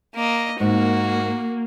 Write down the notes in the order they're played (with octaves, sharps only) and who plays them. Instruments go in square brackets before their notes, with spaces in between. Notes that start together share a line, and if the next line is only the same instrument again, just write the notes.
[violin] A#3 D#5
[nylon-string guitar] G#2 [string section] A#3 [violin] F#4